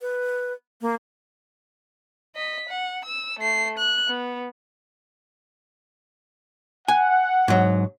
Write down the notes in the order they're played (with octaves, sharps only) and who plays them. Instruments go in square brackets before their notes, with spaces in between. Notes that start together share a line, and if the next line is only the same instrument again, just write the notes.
[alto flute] B4
A#3
[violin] D#5 B6
F#5
E6
A3 C7
F#6
B3
[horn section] F#5 [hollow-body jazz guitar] G#5
[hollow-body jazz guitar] G#2 F#3